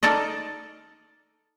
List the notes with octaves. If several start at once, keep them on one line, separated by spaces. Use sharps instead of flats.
D#4 A4 A#4 D5 D#5